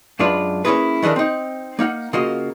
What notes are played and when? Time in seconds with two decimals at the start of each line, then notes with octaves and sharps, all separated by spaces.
0.19 F#2 G#3 D4 F4 B4
0.65 A#3 C#4 D#4 E4 G#4 B4
1.02 D#3 E3 D4 G#4 A#4
1.16 C4 D#4
1.79 A#3 D#4 F5 F#5
2.13 C#3 A#3 F4 F#4 D#5